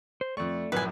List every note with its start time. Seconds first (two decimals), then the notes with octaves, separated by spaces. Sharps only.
0.21 C5
0.37 F2 A3 D5 C#6
0.72 A#1 F#2 A2 B4 G#5